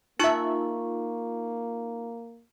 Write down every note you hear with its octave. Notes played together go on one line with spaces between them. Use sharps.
A#3 D#4 F4 E5 A5 C#6